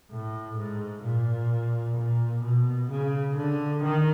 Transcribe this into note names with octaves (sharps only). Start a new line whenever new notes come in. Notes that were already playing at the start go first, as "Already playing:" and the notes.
A2
G#2
A#2
A#2
B2
C#3
D3
D#3